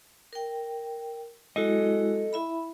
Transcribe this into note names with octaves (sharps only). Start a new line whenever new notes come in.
A#4 G5
G#3 E4 F#4 A4 D#5
E4 E5 B5